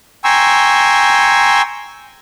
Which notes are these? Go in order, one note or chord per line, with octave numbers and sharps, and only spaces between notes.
G5 G#5 A#5 C6 C#6 E6